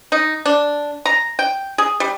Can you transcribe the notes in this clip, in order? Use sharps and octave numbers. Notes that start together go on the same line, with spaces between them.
D#4
D4
A#5
G5
G#4
G3